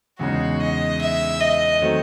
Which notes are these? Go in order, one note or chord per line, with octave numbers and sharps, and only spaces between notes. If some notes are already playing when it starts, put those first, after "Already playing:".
E2 C#3 G#3 D#4 F#4
D#5
E5
D#5
D#3 F#3 A3 C4